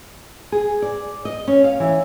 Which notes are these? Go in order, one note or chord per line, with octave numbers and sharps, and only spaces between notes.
G#4
D5
D#5
C#4
F5
E3